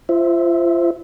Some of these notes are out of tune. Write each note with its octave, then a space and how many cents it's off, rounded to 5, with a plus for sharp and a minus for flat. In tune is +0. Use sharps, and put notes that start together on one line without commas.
F4 -30 C5 -5 E5 -5